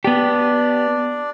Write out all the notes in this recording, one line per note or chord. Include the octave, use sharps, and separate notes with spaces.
B3 D4 G4 D5